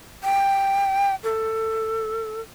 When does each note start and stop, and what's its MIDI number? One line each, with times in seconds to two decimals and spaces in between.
0.24 1.15 79
1.24 2.41 69